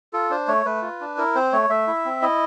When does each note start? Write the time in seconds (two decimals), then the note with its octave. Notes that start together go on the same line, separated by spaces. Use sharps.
0.13 F4 A4
0.30 D4 C5
0.48 A3 C#5
0.65 A3 B4
0.82 F4
1.01 D4
1.17 E4 A#4
1.35 C4 C5
1.53 A3 C#5
1.70 A3 E5
1.87 E4
2.05 C4
2.22 E4 D#5